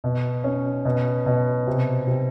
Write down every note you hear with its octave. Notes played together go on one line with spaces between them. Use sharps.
B2
C#4
B2
B2
C3
C3